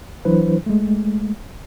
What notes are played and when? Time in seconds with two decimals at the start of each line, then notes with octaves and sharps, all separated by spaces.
0.25 E3 F#3 D4 E4 B4 C5
0.66 G#3 A3